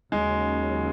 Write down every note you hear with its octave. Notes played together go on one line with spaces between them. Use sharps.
D#2 C#3 F#3 G#3 C#4